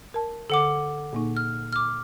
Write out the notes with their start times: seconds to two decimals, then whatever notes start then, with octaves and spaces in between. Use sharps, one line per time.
0.14 A#4 A5
0.50 D3 A4 F#5 D6
1.13 A#2 A#3 D#4
1.37 F6
1.73 D6 F6